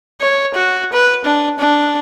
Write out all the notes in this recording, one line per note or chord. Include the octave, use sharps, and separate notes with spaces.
C#5
F#4
B4
D4
D4